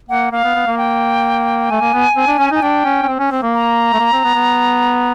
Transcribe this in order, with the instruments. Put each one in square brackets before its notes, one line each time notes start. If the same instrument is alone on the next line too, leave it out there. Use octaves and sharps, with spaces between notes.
[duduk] A#3 [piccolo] F#5
[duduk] A#3 [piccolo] F5
[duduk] B3
B3
A#3
[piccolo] G5
[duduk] A3 [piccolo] G#5
[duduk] A#3
B3
C4
D4
C#4
[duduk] D#4 [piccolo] G#5
[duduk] D4 [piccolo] G5
[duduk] C#4
C#4
C4
C#4
C4
A#3
[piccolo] A#5
[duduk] A3
A#3
C4
B3
B3